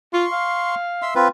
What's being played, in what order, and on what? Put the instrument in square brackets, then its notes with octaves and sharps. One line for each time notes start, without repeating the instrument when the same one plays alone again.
[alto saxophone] F4 [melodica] C6 C#6
[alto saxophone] F5
[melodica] E5 C6 E6
C4 F4 B4